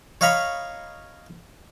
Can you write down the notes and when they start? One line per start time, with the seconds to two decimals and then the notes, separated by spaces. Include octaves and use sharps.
0.21 C#5 D#5 F5 A#5 B5 C#6